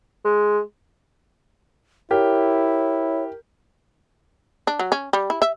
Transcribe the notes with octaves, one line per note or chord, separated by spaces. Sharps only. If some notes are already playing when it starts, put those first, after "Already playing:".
G#3
E4 G4 A#4 C#5
D4
F#3
C#4
G3
E4
E5